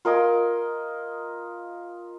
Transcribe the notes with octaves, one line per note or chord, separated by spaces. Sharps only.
F4 A#4 D#5 G#5